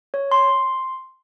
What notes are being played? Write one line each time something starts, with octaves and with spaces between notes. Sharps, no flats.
C#5
C6